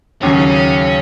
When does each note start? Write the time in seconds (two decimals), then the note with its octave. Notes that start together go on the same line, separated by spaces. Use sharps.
0.22 D#2 C#3 F#3 C#4